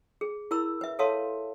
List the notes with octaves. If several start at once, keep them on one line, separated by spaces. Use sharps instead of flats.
G#4
E4 A#4 B5 E6
B4 E5
A4 C#5 E5 F5 A5 C6